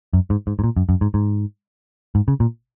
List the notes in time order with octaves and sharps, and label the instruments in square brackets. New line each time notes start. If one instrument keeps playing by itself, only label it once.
[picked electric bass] F#2
G#2
G#2
G#2
A#2
F#2
F#2
G#2
G#2
G#2
C#3
A#2